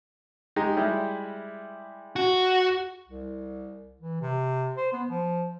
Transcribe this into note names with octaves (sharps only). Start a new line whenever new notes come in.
G#3 D#4 G4
G3 G#3 E4
F#4
C2
E3
C3
C5
B3
F3